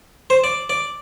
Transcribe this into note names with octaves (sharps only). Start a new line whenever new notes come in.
C5
D5
D5